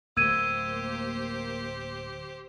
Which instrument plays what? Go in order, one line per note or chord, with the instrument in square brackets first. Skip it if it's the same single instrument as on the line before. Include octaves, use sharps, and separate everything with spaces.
[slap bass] D1 A3 [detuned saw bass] A#3 [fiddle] G4 C5 [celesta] E6 G#6 D#7